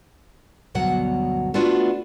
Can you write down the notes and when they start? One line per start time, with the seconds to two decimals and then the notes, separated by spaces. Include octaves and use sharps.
0.75 D2 G2 B2 F#3 F#5
1.54 A3 B3 D4 F4 F#4